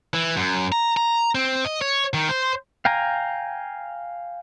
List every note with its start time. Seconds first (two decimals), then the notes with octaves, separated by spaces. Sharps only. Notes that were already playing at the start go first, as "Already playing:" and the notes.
0.14 E3
0.37 F#2
0.72 A#5
0.97 A#5
1.35 C4
1.65 D#5
1.82 C#5
2.14 D#3
2.29 C5
2.85 F5 G5 G#5 A#5